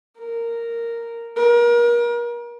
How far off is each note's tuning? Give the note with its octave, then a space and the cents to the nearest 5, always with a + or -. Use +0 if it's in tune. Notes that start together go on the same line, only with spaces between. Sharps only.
A#4 -5
A#4 +35